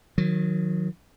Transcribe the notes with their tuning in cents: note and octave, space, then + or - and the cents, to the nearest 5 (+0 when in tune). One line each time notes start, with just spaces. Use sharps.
D#3 +0 F#3 -30